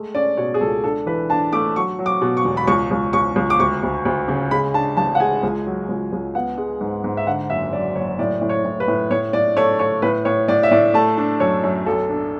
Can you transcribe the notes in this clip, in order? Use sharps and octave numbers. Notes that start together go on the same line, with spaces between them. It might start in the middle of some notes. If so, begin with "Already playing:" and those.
Already playing: G#3 A3
C#4 D5
B2 C#5
G#4
C#2 A4
D4 A4
E3 B4
D4 A5
A3 D6
F#3 C#6
F#3
D6
B2
C#6
E1
B5
C#2 C#6
C#2
C#2 C#6
C#2
D6
D2 C#6
D2
D2
C#3
G#3 B5
D4 A5
A1 A5
F#5
G#3 G#5
C#2
F#3
C#2
C#2
B3 F#5
G#3
G#2
G#2
E5
D3 F#5
F#1 E5
F#2 D5
F#1 C#5
A2 D5
A2
C#5
A2
B4
A2
A2 C#5
A2 D5
A3 C#5
A3 C#5
A2 B4
A2 C#5
A2 D5
E5
A2 D5
A3 A5
D4
F#2 C#5
F#2
B1 A4
D4